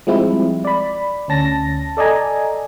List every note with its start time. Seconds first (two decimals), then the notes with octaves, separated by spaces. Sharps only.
0.07 F3 G3 G#3 C4 E4
0.65 D5 B5
1.28 D2 C#4 A5 A#6
1.97 A4 D5 D#5 G#5 A#5